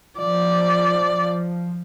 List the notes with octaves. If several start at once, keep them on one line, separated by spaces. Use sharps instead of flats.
F3 D5